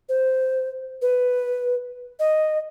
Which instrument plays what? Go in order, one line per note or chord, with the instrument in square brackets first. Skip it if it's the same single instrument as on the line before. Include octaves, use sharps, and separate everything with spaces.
[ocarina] C5
B4
D#5